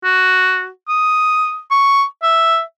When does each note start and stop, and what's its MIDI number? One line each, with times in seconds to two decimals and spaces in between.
0.04 0.68 66
0.89 1.61 87
1.71 2.04 85
2.23 2.61 76